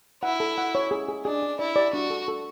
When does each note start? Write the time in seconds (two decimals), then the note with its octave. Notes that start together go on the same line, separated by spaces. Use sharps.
0.23 E4 F#5
0.40 A4
0.58 F#5
0.75 C#5
0.91 G#4
1.08 G#4
1.25 D4 G#4
1.42 G#4
1.59 E4 D5
1.76 D5
1.93 D4 F#4
2.10 A4
2.28 A4